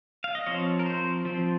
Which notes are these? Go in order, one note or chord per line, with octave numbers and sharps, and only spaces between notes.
F5
D#5
F3 C4 C#5
A#4
C5
F3 C4